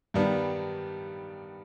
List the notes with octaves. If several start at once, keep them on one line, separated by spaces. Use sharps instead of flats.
G2 D#3 G3 B3 D4